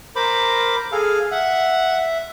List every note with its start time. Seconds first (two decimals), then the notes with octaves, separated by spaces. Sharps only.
0.16 A#4 C5 B5 D6
0.92 G#4 A4 F5
1.32 E5 F#5